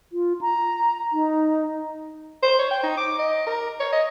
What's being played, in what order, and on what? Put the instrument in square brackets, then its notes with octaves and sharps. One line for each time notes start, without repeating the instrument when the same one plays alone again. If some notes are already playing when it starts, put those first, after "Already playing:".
[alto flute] F4
A#5
D#4
[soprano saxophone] C5
C#5
G5
D#4
D6
D#5
A#4
C#5
D#5